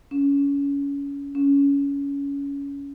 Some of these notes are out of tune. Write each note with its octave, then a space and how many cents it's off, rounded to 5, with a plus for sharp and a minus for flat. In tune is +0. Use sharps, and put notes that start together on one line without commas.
C#4 +25
C#4 +20